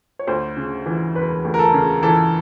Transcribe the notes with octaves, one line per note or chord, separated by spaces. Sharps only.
C#5
D2 C5
C#3
E3
E1 B4
D2
A#4
A4
C#3
E3 A4